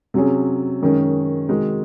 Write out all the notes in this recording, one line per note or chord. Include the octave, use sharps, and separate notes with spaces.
C3 F#3 C#4 G#4
F#2 D#3 G#3 C#4
C3 D#3 G#3 D#4 F#4